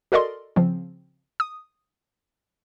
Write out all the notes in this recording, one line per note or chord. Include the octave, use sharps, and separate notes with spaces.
F#4 A4 A#4 D5 D#5 C6
C#3 F3 C4
D#6